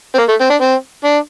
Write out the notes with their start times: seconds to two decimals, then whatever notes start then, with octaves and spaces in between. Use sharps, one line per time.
0.15 C4
0.18 A#3
0.29 A3
0.40 C4
0.50 D4
0.61 C4
1.04 D4